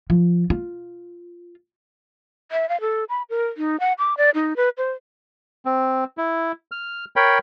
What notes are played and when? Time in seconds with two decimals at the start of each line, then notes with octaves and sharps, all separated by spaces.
0.10 F3
0.50 F4
2.52 E5
2.69 F5
2.81 A4
3.09 B5
3.30 A#4
3.57 D#4
3.80 F#5
3.99 D6
4.17 D5
4.35 D#4
4.57 B4
4.78 C5
5.65 C4
6.18 E4
6.72 F6
7.16 A#4 C#5 G5 B5